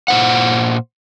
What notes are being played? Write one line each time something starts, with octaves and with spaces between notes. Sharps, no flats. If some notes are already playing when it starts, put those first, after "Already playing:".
A#2 C5 F#5